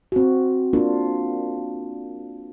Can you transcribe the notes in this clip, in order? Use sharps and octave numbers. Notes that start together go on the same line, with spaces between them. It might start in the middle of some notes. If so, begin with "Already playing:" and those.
C4 F#4
A#3 D4 F4